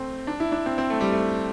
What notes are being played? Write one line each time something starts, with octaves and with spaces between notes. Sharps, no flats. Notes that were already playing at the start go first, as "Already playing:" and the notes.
Already playing: A3 C4
D4
E4
D4
C4
C4
A3
G3
A3